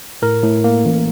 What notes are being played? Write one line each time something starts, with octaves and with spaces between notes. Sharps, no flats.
A2 A#4
A2
A#3
A1